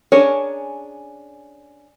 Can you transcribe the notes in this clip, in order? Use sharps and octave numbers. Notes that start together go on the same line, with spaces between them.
C#4 D4 G#4 A#4 C#5